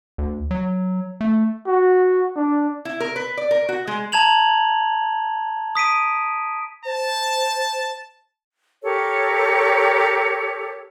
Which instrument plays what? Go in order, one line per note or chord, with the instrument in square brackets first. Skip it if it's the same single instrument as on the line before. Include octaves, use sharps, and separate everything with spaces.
[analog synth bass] D2
F#3
A3
[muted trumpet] F#4
D4
[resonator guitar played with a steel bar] E4
A#4
B4
D5
A#4
F#4
G#3
[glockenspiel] A5 A#5 G#6 F7 F#7
D#6 B6 D7 D#7
[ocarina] C5 [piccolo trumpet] A5
[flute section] G4 A4 A#4 C#5